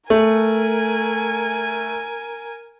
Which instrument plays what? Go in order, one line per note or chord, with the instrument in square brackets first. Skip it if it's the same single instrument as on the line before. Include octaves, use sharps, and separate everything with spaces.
[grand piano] A3 [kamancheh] A#4 G#5